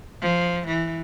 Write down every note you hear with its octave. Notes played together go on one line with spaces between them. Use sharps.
F3
E3